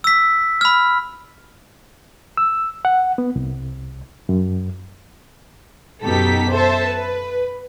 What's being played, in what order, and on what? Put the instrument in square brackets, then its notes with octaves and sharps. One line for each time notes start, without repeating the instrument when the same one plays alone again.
[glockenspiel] E6 B6
B5 F6
[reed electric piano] E6
F#5
B3
C2
F#2
[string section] F#2 B2 D#4 G4 A4 B6
A4 C5 E5 A5
B4